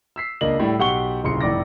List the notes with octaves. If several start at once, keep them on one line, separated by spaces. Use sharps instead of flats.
E6 B6 C7
C#2 A#3 D4 D#5 F#7
A2 G3
B1 G4 F#5 C#6 G7
D#1 C2 C#3 C6 C#7
F1 A2 D5 D6 A#6